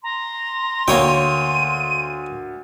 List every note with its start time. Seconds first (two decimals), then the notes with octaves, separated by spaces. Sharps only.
0.03 A#5 C6
0.88 D2 A#3 C#5 G5 D#7